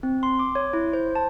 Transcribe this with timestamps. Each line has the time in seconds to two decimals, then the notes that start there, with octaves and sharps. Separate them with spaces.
0.03 C4
0.23 C6
0.39 D6
0.55 C#5
0.73 E4
0.93 C5
1.15 A5